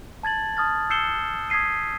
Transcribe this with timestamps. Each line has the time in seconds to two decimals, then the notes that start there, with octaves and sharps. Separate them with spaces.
0.23 A5 G#6 A6 F#7
0.57 A5 D#6 F6 A6
0.90 E6 G6 C7 C#7 E7 G7
1.50 D#6 G#6 B6 C7 D#7